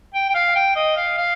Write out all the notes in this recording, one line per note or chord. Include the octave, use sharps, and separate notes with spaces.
G5
G5
F5
G5
D#5
F5
F5